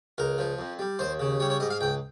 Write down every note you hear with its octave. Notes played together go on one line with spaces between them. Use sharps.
C#2 A#4
F3
F2
G3
D#2 C5
C#3
G3 C#5
C#5
G#2 D#5
F5
C#2 G5